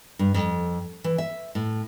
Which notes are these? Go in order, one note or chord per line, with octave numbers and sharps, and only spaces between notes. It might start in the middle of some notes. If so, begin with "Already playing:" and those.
G2
F2
E3
E5
A2